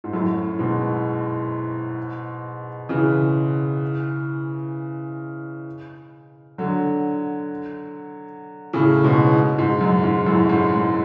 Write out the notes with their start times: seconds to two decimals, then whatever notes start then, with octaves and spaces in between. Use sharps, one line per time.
0.04 G#2
0.13 F#2 A2
0.59 G#2 B2
2.89 C#3 E3
6.58 D3 F#3
8.73 A2 C#3
9.04 G#2 B2
9.58 G#2
9.81 F#2
10.04 G#2
10.26 F#2 A2
10.49 G#2
10.73 G#2